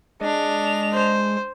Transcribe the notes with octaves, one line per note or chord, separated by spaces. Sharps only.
G#3 D4 D#5 F7
C5